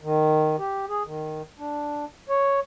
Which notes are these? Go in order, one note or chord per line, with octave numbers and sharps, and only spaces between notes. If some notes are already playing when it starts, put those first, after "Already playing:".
D#3
G4
G#4
D#3
D4
C#5